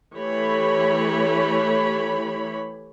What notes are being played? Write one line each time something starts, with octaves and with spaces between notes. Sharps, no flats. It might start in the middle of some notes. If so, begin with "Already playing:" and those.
E3 A3 G4 C#5 B5